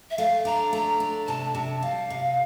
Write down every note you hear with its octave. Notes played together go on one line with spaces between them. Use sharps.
E5
A3 F5
D4 A#5
A3 A#5
D4
C3 A5
C3
G3 F5
C3